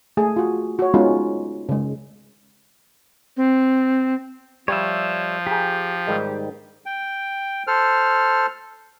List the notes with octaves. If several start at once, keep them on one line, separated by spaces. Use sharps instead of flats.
A3 G#4
F4 F#4
F#4 C#5
G#3 B3 C#4 D#4 F4 F#4
C#3 G#3
C4
F3 G3 C#5 E5
G4 G#4 A#5
G#2 D#3 G3
G5
A4 C5 F6